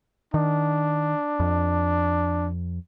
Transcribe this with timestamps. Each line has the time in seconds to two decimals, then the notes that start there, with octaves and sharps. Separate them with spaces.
0.34 D#3 D4
1.40 F2